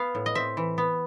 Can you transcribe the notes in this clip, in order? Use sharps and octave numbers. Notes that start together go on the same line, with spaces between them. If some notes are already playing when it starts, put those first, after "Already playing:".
Already playing: B3 F5
A2
D#5
C4 E5
E3
B3